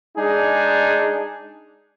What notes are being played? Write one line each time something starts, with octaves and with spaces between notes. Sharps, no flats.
G#3 D4 D#4 G#4